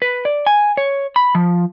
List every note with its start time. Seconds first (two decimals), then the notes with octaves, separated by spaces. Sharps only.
0.02 B4
0.25 D5
0.47 G#5
0.77 C#5
1.16 B5
1.35 F3